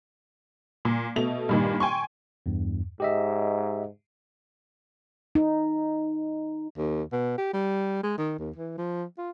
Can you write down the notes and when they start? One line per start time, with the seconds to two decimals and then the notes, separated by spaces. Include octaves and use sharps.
0.85 A#2
1.16 B2 A3 F7
1.49 G2 A#2 D#3
1.80 G5 G#5 C6 C#6
2.46 E2 G2
3.00 G#2 G4 D#5 E5
5.35 D#4
6.78 D#2
7.12 B2
7.38 G4
7.54 G3
8.03 G#3
8.18 D#3
8.39 D#2
8.56 E3
8.78 F3
9.18 F4